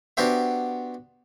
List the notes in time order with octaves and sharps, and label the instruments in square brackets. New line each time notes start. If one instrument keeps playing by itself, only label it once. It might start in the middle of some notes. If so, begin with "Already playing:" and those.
[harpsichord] B3 D4 F#4 G4 C5 E5